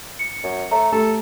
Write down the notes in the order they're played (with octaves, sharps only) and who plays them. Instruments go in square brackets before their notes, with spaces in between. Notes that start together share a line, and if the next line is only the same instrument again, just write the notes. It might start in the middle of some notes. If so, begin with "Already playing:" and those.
[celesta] C#7
[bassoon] F#2
[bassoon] A3 [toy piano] C#5 A#5
[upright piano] A3 [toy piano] G4 [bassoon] A4